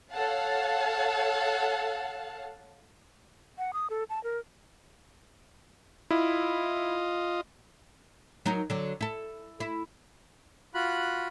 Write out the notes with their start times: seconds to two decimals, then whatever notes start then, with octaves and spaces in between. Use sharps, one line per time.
0.11 A4 C#5 F5 F#5 A5
3.58 F#5
3.73 D#6
3.90 A4
4.10 A5
4.24 A#4
6.11 E4 F4 D#5
8.46 F#3 D#4 A#4
8.70 D3 F#3
9.01 E4 A4
9.60 E4
10.75 F4 F#4 B5 F#6